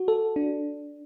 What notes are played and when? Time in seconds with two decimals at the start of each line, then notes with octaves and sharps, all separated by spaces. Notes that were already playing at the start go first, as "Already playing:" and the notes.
Already playing: F#4
0.08 A4
0.36 D4